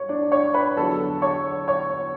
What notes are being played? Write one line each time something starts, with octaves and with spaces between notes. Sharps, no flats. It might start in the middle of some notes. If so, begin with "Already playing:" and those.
Already playing: G2 C#5 C#6
D4 D5
C#5 C#6
B4 B5
E2 D3 F#3 A4 A5
C#5 C#6
C#5 C#6